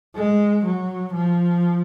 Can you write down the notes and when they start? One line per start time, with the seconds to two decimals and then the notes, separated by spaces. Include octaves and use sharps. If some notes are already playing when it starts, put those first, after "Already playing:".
0.15 G#3
0.65 F#3
1.14 F3